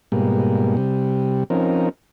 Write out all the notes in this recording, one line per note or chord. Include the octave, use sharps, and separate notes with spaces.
G#2 B2 G3 A#3
C3 G3
F3 C4 C#4 D#4 A#4